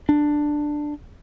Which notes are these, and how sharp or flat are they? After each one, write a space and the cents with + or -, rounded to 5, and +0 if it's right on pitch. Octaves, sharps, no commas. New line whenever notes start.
D4 +10